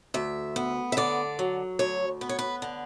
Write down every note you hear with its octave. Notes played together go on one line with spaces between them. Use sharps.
D2 E5
B3
E5
D3 D5
F#3
D2 C#5
B3 B4
C#5
B4
D3